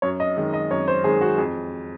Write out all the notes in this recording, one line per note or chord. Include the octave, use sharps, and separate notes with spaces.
F#2 C#5
D#5
D#3 G#3
D#5
F#2 C#5
C5
D#3 G#3 G#4
F#4
F2 G#4